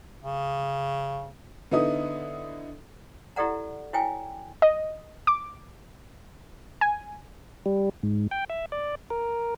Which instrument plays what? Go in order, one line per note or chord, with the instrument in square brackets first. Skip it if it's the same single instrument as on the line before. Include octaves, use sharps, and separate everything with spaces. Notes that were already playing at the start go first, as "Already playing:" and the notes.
[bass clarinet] C#3
[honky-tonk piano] D3 B3 D#4 E4 D#6
[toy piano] E4 G4 A4 D5 F#5 A#5
E4 F#4 C#5 G5 G#5
[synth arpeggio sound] D#5
D6
G#5
[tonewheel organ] G3
G#2
G5
E5
D5
A#4